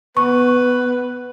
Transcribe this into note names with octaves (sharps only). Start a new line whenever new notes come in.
B3 B4 C#6